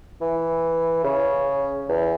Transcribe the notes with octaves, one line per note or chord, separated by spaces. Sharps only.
E3
C#3
E2